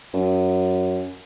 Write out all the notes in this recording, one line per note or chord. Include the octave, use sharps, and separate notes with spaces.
F#2